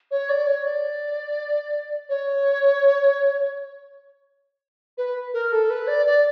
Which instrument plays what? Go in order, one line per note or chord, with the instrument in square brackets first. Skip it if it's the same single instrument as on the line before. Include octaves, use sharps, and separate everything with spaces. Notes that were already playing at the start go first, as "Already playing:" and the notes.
[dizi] C#5
D5
C#5
D5
C#5
B4
A#4
A4
B4
D5
D5